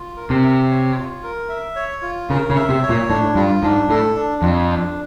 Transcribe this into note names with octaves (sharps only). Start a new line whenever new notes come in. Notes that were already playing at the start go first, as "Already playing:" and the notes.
Already playing: F4
A#4
C3
E5
C#5
F4
A#4
E5
C#5
F4
C#3 A#4
C#3
E5
C3
C#5
A#2
A2 D4
G2 F4
G#2 D4
A2 A4
D4
F2 F4
D4